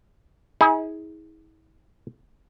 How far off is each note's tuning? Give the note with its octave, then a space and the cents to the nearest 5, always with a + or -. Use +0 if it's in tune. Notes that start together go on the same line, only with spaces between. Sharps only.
E4 -45 G#4 +0